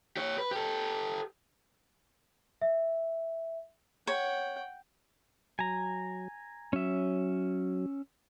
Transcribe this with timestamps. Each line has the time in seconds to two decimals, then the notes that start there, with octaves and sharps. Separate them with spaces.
0.17 G4 C#5
0.38 B4
0.51 G4 A4
2.61 E5
4.07 C#5 F#5 G5
5.59 F#3 G#5 A#5
6.73 F#3 C#4 E5